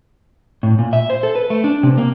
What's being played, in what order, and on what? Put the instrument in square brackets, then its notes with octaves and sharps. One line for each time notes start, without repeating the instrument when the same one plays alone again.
[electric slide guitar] A2
A#2
E5
C5
A4
B4
A3
D4
C3
A#3